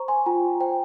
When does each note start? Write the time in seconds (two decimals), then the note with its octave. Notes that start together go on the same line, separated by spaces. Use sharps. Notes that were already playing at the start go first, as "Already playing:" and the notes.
Already playing: C5 A#5 C#6
0.08 G#5 C6
0.26 F4 G5 A#5
0.60 C5 G5